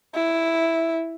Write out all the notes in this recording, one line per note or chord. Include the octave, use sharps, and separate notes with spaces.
E4